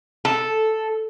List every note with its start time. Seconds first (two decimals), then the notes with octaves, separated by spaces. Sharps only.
0.25 A4